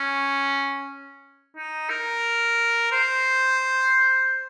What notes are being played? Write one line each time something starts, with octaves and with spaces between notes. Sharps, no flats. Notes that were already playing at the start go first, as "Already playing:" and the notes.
Already playing: C#4
D#4
A#4
C5